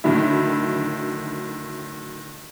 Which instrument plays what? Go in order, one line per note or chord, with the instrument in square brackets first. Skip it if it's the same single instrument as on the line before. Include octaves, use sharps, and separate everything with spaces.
[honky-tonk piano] A2 D3 D#3 F#3 E4